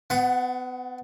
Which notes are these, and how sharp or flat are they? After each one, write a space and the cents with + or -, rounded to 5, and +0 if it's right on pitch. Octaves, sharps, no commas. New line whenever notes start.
B3 +35 F#5 +0